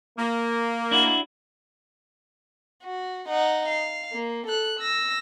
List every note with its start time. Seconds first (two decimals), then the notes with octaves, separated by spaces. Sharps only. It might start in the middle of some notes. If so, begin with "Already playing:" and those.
0.18 A#3
0.91 D4 E4 F#4
2.83 F#4
3.29 D#4 F#5
3.69 F5
4.12 A#3
4.47 A4 F#6
4.79 E6 A#6